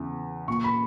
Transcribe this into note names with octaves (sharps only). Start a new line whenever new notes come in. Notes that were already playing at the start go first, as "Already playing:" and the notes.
Already playing: E2 C#3 E3
A#2 C#6
B5